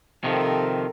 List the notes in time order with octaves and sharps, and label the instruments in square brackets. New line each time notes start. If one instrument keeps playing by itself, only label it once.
[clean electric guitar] C3 D#3 F3 [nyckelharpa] A4 A#4